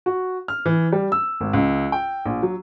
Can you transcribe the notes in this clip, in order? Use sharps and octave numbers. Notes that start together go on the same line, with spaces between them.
F#4
F6
E3
G3
E6
G#1
C#2
G5
A#1
F#3